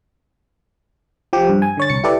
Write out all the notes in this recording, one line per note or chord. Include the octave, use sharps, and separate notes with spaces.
F3 G4
G2
G#5
D3 C#5 A6
C2 C#7
E4 G4 A4 B4 D5